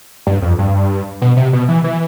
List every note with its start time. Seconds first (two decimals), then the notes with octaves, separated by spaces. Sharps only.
0.27 G2
0.42 F2
0.58 G2
1.22 B2
1.37 C3
1.53 B2
1.68 E3
1.84 E3